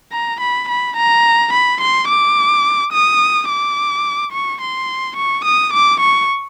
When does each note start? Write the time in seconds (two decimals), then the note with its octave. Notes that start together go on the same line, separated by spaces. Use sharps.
0.12 A#5
0.40 B5
0.69 B5
0.96 A#5
1.53 B5
1.81 C6
2.08 D6
2.93 D#6
3.49 D6
4.32 C#6
4.61 C6
5.17 C#6
5.44 D#6
5.73 D6
6.00 C#6